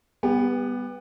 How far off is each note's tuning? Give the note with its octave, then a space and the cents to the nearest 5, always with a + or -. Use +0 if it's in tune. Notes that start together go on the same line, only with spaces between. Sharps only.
G3 +10 B3 +0 G4 +30